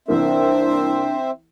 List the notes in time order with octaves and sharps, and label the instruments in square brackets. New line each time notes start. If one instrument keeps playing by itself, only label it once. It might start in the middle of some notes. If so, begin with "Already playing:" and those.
[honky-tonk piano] C2 E3 A#3 [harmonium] C4 C5 E5 [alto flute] D4